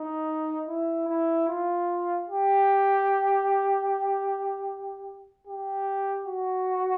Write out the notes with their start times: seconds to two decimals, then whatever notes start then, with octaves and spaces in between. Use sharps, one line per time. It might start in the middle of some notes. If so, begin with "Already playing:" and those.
Already playing: D#4
0.68 E4
1.08 E4
1.48 F4
2.28 G4
5.47 G4
6.27 F#4